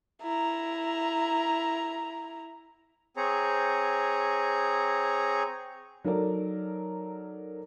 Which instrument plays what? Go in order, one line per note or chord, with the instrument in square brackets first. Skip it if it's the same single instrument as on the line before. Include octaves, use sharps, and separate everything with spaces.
[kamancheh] E4 A#5
[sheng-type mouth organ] C4 G#4 C#5 A#5
[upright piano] F#3 D#4 A4 A#4 D5